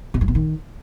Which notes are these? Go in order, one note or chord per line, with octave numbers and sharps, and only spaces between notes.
C3
G2
B2
D#3